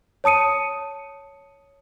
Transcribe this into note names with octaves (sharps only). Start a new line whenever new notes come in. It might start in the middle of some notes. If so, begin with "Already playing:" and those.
C#5 A5 D#6 C#7 D#7